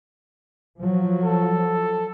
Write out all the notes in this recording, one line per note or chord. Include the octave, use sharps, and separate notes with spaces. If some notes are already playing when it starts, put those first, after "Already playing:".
F3 F#3
A4